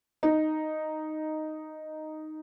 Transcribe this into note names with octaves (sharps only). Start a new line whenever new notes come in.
D#4